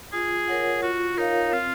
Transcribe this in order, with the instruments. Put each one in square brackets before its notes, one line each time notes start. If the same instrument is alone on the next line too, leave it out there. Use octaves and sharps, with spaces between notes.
[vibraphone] F4 [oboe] G#4
[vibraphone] A#4 C#5 F#5
[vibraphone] F4 [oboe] F#4
[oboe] D#4 [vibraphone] A#4 C#5 F5
[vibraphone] C4 [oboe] F4